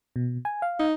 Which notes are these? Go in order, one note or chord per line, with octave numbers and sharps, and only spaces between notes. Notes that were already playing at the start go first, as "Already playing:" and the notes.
B2
G#5
F5
D#4